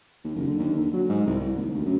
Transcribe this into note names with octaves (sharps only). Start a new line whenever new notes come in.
D#2
F#1
D3
D#2
D3
F#3
G#2
C2
C2
D#2
D2
F#2